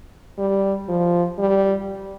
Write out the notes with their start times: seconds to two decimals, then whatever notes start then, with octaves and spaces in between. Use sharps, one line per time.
0.38 G3
0.88 F3
1.39 G3